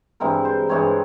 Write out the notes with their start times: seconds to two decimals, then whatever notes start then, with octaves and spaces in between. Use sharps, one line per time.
0.20 G2 E3 G#3 C4 A#4
0.45 C5
0.69 G2 E3 G#3 C4 C#5